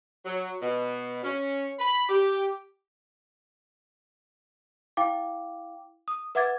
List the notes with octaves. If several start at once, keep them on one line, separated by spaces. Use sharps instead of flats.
F#3
B2
C#4
B5
G4
E4 F5 G5 D6
D#6
B4 E5 F#5 D6 G#6 A6